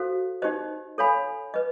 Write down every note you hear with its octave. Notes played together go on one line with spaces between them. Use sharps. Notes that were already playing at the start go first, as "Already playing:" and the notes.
Already playing: F#4 A4 C5 F5
D#4 G4 C5 D#5
A4 C#5 F5 G#5 B5
B4 D#5